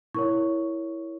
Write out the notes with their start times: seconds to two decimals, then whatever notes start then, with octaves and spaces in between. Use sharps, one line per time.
0.14 E4 A#4 C#5 C#6